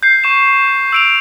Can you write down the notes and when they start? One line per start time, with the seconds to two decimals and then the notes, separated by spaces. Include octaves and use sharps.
0.03 G6 C7
0.24 C#6 E7
0.93 E6 D7 F7